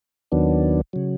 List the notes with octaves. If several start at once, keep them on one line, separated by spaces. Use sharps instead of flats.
D#2 D#3 F#3 B3 D4
C#3 F#3